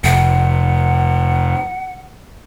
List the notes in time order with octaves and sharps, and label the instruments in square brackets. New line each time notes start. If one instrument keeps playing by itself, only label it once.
[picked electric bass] F1 [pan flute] F#5